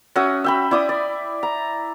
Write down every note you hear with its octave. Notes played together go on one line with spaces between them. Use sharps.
C#4 F#4 E5 D#6
E5 G5 B5
E4 D5 D6 D#6
D5
A#5